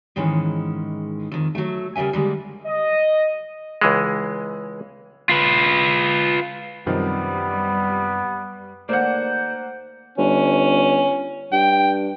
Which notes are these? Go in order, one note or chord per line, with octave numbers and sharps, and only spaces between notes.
G#2 D#3 E3 G#3 C#4
F2 D#3
F#3 A3
C#3 G3 A#4 E5 G#5
D3 G3 G#3 A#3
D#5
C#2 E3 G#3
F4 B4
F#2 C3 D#3 F3 G3 B3
D#2 A3 A#3 C5 D5 F#5
G1 C#4
G2 G5